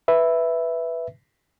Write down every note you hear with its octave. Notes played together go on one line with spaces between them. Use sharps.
B4 E5